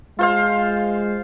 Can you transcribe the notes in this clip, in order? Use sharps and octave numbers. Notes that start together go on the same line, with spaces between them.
G#3 F4 C5 F5